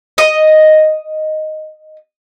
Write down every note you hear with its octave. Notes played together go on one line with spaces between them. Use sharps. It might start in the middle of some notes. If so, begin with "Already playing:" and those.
D#5 D#6